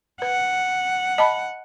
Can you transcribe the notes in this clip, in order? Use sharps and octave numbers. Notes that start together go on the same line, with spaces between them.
B4 F#5
D#5 A5 B5